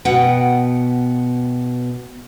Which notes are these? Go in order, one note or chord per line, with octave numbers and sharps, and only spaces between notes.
B2 B4 F#5 G5